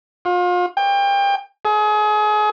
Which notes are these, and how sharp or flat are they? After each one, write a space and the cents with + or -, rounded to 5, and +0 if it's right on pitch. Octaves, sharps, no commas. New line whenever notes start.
F4 +35
G5 +30
G#4 +30